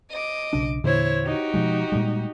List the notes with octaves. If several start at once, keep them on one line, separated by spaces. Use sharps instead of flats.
D#5 D6
B1 C#3 D4
E2 A#2 D3 E4 C5 C#5
D#4 F#4 G4
B2 F3 G#3
A#2 G3 G#3